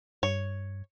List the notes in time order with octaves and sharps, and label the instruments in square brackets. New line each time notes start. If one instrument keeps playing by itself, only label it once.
[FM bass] G2 [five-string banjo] C#5